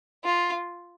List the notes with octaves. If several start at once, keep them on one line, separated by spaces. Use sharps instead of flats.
F4